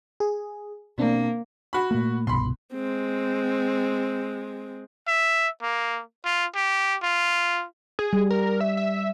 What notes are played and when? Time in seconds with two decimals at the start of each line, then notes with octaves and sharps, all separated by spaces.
0.20 G#4
0.98 B2 A#3 C4 D4
1.73 F#4 B5
1.91 A#2 A3 A#3
2.27 G1 C2 B2 B5 C6
2.73 G#3 C4
5.07 E5
5.62 A#3
6.25 F4
6.55 G4
7.03 F4
7.99 G#4
8.13 G3
8.31 A#4
8.61 E5
8.77 E5